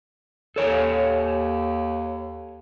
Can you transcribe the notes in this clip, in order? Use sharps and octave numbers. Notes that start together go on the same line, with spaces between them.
D#2 A4 C#5 G#5